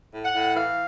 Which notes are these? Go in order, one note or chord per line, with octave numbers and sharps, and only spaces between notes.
A2
F#5
A2
E3 F5